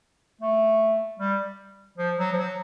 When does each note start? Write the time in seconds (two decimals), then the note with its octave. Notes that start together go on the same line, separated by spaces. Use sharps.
0.41 A3
1.19 G3
1.97 F3
2.18 F#3
2.32 F3
2.37 F#3